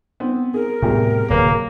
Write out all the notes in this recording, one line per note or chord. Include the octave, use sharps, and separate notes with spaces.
B3 C4
G#4 A#4
E2 A2 C3 G3 G#3
D1 C3 F#3 A#3 G#4 B4 C#5